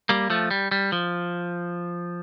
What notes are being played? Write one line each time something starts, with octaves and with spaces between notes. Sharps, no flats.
G3 A#3
F3 A3
G3
G3
F3